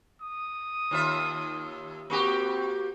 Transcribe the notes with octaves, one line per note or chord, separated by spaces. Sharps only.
D#6
D#2 F4 E5
A#3 C4 F#4 G4